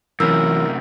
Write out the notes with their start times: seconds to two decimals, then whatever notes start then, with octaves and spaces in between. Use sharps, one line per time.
0.20 F#2 C3 E3 F#3 A#4 E6